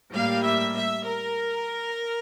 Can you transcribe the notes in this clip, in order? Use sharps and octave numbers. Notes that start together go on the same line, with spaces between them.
A2 G3 A#3 F5
E5
E5
A#4